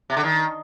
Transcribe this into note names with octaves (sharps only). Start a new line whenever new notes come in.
C3
D3
D#3